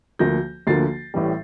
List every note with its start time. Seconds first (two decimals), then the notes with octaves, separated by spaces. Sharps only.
0.19 D2 D3 F3 A#3 G6 A#6
0.67 D2 D3 F3 A#3 A6 C7
1.14 A1 A2 E3 G3